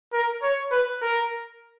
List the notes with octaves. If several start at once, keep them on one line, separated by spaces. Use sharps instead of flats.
A#4
C#5
B4
A#4